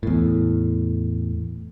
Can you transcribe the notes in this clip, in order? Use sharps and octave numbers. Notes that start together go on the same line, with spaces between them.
E2 A2